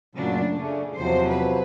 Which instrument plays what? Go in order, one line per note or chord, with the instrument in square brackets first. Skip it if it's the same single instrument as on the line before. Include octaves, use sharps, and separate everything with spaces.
[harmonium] F#2 A#2 F#3 [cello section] C#3 A3 D4
[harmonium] C#3 A3 D4 [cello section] C#4
[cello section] E2 C5 [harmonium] C3 F3 F#3
[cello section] B4